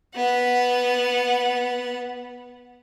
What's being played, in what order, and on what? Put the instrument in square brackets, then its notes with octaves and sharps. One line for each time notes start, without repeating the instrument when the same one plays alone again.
[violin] B3 F#5